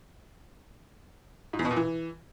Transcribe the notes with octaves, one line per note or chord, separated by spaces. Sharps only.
G#2
E2
B2
A#2
E3